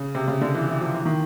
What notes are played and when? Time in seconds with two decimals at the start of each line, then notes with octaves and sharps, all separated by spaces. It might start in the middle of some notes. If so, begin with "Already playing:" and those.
Already playing: C#3
0.15 C3
0.28 C#3
0.41 D3
0.54 E3
0.69 E3
0.81 F3
0.93 E3
1.05 D#3